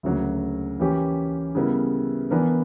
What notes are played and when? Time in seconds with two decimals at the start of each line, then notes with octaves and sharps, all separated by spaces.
0.03 D2 C#3 F#3 A#3
0.80 E3 A#3 C#4 G4
1.55 C#3 G3 B3 E4 A#4
2.31 E3 B3 D4 A#4